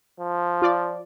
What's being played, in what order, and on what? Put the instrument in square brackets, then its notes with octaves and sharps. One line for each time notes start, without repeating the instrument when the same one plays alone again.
[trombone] F3
[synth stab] F4 D5